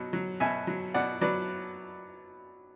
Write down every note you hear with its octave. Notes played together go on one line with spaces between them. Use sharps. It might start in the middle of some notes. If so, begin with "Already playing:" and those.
Already playing: B2 F#3
F#3
B2 E5 G#5
F#3
B2 D5 F#5
F#3 B4 D5